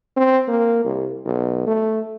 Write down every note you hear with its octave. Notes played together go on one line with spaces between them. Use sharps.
C4
A#3
C2
B1
A3